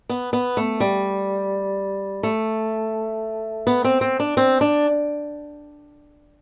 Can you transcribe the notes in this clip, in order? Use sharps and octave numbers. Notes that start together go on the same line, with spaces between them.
B3
B3
A3
G3
A3
B3
C4
C4
D4
C4
D4